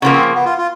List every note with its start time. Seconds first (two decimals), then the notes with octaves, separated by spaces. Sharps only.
0.02 C#3 F3 A#3 B3
0.13 C4
0.35 B3
0.45 F4
0.58 F4